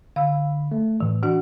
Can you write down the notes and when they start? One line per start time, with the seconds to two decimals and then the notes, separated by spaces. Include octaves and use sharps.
0.16 D3 F5 B5 E6
0.72 A3
1.00 A2 D#3 E3
1.23 E3 D4 F#4 F#5